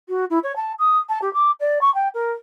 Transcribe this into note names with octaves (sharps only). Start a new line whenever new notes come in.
F#4
E4
C#5
A5
D#6
A5
G4
D6
D5
C#6
G5
A#4